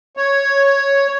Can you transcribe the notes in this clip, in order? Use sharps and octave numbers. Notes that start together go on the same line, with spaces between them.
C#5